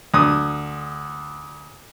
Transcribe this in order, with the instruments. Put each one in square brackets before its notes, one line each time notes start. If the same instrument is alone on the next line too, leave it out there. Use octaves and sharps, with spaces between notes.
[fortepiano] D2 D#6